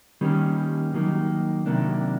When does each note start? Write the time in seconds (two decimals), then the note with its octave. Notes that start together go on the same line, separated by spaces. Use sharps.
0.21 D#3 G3 A#3 C#4
0.94 D#3 F#3 A#3 D#4
1.66 C3 D#3 F#3 A#3 D4